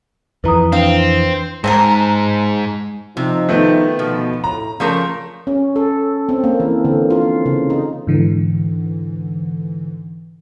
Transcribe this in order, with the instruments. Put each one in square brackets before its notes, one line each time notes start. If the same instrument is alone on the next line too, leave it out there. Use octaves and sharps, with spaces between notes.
[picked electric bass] F2 E3 [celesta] B4 A#5 D#6
[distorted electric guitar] C4 [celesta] D4 B4 F7 [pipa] F5
[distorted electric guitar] G#2 [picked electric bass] G#3 [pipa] C4 D#4 A#4 [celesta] A5
[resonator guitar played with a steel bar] C3 [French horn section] F3 D#4
[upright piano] D#3 A3 B3
[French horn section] B2 [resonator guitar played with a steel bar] F3
[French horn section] A2 [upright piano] A#5
[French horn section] C#3 [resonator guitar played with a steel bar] F3 A3 A#4
[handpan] C#4
A4
C4
A#3
E3
D3
F4
C#3
D#4
[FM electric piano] G#2 D3 E3